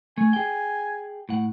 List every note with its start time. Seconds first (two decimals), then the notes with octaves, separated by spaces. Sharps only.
0.18 A3 G#5
0.33 G#4 G5
1.29 A2 F#5